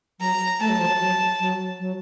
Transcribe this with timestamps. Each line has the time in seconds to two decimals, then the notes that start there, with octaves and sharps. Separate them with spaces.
0.20 F#3 A#5
0.60 A3 A5
0.69 F#3
0.79 F3
0.88 F#3
1.00 F#3
1.40 F#3
1.80 F#3